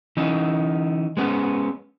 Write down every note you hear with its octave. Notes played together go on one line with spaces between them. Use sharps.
E3 C#4 D#4
G#3 B3 C#4